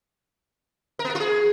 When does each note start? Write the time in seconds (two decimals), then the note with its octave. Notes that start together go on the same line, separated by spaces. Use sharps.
0.99 A#4
1.04 B3
1.10 A#4
1.15 F4
1.20 G#4